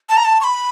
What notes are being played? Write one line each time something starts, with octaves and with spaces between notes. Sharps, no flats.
A5
A#5
A5
C#6
B5